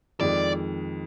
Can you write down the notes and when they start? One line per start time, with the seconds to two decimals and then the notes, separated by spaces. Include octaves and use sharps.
0.21 F2 D#3 G#3 D5